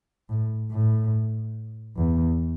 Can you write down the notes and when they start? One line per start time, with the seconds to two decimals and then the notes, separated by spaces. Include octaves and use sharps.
0.29 A2
0.71 A2
1.96 E2